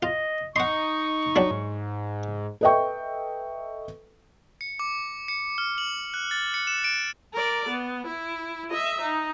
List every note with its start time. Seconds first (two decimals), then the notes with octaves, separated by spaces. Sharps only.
0.03 F4 D#5
0.56 D#4 F#5 C6 C#6
1.36 F#3 G3 D4
1.51 G#2
2.61 A4 B4 D#5 E5 G5 C#6
4.61 C#7
4.79 D6
5.28 C#7
5.58 F6
5.78 F#7
6.14 F#6
6.31 A6
6.54 C#7
6.67 E7
6.84 D7
7.34 A#4 D5
7.69 B3
8.07 E4
8.70 D#5 E5
9.01 D#4